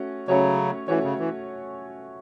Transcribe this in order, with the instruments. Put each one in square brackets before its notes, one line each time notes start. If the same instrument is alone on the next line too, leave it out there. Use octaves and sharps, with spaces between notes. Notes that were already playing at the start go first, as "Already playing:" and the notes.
Already playing: [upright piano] A3 C#4 F#4
[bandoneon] C#3 F#3 [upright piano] A3 C#4 F#4 C#5
[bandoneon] E3 [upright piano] A3 C#4 F#4 C#5
[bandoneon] C#3
E3